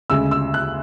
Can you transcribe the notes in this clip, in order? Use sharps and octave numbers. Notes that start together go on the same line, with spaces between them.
D2 C#3 G#3 E6
E6
F#6